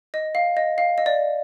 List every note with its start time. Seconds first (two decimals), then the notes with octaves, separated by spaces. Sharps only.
0.14 D#5
0.35 F5
0.57 D#5
0.78 F5
0.98 D#5
1.06 D5